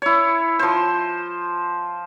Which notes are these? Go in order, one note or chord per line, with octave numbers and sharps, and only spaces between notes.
E4 C#5
F3 C5